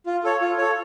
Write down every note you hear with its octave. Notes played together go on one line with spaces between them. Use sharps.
F4
A4 C#5
F4
A4 C#5